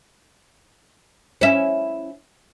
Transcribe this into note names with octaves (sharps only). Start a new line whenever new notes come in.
C#4 E4